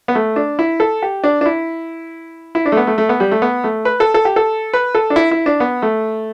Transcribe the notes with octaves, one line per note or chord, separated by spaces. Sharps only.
B3
A3
D4
E4
A4
G4
D4
D4
E4
E4
D4
A3
B3
A3
A3
B3
G3
A3
B3
A3
B4
A4
A4
G4
A4
B4
A4
D4
E4
E4
D4
B3
A3